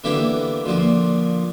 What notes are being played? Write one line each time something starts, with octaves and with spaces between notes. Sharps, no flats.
D3 E3 A#3 B3 E4 G4
A#2 D3 F3 A#3